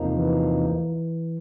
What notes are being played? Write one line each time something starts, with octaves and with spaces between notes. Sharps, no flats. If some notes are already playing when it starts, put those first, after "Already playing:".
Already playing: E2 C3 F3 A#3 D#4
E3